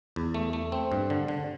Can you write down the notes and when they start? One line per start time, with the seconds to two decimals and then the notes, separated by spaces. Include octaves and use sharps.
0.16 E2
0.34 A3
0.53 A3
0.72 C4
0.92 G2
1.10 D3
1.28 D3